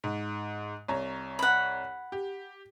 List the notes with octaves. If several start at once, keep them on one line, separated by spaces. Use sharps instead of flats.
G#2
C2 C#5 A#5
F#5 B5
G4